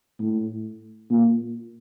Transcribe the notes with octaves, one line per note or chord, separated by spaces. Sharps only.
A2
A#2